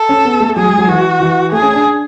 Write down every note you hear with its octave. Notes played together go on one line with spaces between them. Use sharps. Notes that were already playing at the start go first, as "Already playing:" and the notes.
Already playing: A4
C#4
B3
A3
F#3 G#4
G#3
F#3
E3 F#4
E3
A3 G#4
C#4
D4
D4